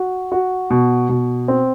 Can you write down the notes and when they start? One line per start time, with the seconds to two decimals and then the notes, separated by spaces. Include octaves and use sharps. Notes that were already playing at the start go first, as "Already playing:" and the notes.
Already playing: F#4
0.32 F#4
0.70 B2
1.09 B2
1.48 C4